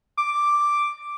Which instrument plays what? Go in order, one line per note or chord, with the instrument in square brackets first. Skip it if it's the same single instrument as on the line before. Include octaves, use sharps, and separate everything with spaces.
[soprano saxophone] D6